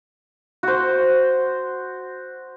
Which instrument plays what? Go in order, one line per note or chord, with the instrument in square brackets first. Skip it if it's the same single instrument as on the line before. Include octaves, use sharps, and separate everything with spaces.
[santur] F#4 C5